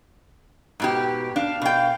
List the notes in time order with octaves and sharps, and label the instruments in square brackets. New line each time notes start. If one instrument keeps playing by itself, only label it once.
[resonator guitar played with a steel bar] G#2 B2 G4
[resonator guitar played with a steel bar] D4 [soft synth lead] F5
[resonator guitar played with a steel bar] B2 G5